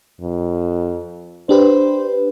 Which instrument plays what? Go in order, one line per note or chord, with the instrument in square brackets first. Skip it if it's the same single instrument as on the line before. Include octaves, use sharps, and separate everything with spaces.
[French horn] F2
[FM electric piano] D4 G4 B4 [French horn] C5